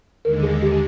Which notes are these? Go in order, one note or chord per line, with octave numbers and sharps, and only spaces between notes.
D#2 D3 G#3 A#4
G#4
G4